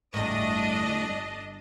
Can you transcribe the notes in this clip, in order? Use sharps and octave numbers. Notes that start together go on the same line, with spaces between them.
G1 E2 A2 D4 D#5